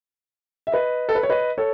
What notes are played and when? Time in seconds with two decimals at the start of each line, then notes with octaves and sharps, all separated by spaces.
0.67 E5
0.72 B4 D#5
1.09 A4
1.15 B4
1.23 C#5
1.30 B4 D#5
1.58 A4 C#5